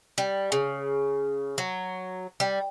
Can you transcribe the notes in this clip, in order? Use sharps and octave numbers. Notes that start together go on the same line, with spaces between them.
G3
C#3
F#3
G3